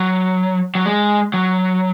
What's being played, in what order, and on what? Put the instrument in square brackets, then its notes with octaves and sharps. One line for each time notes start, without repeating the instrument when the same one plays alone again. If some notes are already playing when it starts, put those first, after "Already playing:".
Already playing: [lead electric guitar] F#3
F#3
G#3
F#3